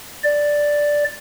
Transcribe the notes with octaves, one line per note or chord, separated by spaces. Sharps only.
D5